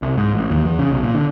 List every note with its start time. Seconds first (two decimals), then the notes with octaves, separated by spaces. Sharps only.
0.02 C2
0.17 G#2
0.34 A1
0.51 D#2
0.65 E2
0.79 C#3
0.91 B1
1.03 A#2
1.15 D3